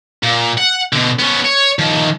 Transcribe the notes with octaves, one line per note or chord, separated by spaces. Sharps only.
A#2
F#5
B2 D3
B3 C#4
C#5
D#3 F3